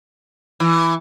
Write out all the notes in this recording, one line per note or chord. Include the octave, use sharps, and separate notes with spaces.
E3